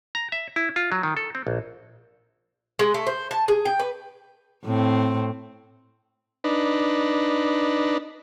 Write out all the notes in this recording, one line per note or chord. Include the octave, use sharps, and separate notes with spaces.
A#5
E5
E4
F4
F#3
D#3
A4
C4
A#1
G#3
A3
C5
A5
G#4
G5
B4
A2 C4
D4 D#4 B4